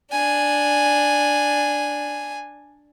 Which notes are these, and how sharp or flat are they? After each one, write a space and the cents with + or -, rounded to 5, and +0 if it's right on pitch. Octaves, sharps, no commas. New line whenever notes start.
D4 +0 G#5 +0